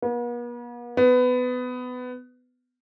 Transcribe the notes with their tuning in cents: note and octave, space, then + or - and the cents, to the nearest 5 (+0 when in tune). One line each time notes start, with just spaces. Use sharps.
B3 -45
B3 +20